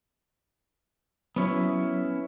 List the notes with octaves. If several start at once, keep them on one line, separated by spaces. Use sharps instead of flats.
F#3 B3 C#4 E4